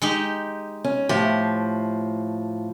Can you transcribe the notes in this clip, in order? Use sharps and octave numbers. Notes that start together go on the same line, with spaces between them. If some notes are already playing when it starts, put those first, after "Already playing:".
G#3 D#4 G4
C#4
A2 F3 G4